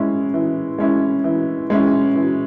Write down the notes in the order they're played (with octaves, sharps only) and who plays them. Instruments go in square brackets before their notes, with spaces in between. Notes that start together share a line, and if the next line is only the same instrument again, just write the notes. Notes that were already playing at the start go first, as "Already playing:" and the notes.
Already playing: [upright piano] G#3 C#4 E4
E3
G#3 C#4 E4
E3
G#3 C#4 E4
E3